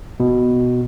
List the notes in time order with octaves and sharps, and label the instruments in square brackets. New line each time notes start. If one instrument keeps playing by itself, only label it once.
[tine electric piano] B2